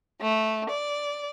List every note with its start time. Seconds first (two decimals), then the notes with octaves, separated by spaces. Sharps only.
0.21 A3
0.69 D5